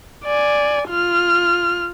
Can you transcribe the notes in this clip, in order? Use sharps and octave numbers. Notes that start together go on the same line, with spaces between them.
D5 G#5
F4 F6